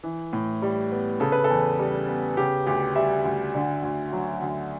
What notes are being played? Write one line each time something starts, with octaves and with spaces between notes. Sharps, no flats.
E3
A2
G3
B3
C#3 A4
B4
A4
E2
G3
B3
C#3 G4
D2 G4
G3 E5
D2
D3
D2
F#3
D2